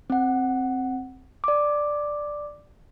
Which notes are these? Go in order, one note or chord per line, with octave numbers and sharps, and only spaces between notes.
C4 F#5
D5 D6